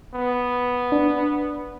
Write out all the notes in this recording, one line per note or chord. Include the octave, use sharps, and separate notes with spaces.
B3
D4